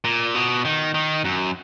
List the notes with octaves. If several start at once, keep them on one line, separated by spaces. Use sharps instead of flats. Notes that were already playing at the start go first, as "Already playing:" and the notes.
A#2
B2
D#3
D#3
F#2